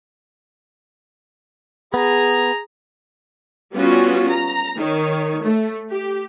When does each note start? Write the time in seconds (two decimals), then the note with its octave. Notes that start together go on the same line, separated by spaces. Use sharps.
1.94 B3 G#4 A#5
3.73 G3 B3 C#4 F4 F#4
4.33 A#5
4.77 D#3 C#5
5.43 A3
5.91 G4